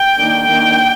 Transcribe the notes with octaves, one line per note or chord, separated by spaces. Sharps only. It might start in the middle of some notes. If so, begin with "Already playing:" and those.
Already playing: G5
D#3 A#3 D4
D#3 A#3 D4 G5